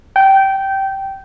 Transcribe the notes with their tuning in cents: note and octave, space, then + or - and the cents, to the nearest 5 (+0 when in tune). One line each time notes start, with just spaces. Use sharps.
G5 -20